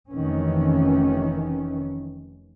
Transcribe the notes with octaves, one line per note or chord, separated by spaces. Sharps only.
F1 C3 D#3 E3 C#4